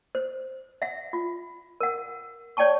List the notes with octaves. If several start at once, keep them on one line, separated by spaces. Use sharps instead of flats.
C5
E5 F#5
F4
A#4 F#5
C#5 D5 G5 A5 C#6